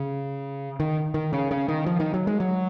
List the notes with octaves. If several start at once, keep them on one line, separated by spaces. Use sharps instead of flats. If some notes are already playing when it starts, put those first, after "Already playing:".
Already playing: C#3
D#3
D#3
C#3
C#3
D#3
F3
D#3
F#3
G#3
F#3